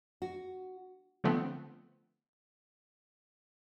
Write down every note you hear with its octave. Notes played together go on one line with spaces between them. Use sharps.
F#4
D3 F3 A3 B3 C4